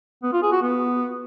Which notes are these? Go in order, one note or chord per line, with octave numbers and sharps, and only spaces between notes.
B3
F4
G#4
F#4
B3